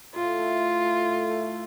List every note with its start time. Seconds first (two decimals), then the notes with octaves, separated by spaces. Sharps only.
0.15 A2 F4
0.38 A3
0.61 A3
0.84 A3
1.08 A2
1.30 A3